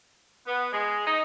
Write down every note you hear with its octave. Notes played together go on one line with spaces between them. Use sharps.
B3
G#3
D#4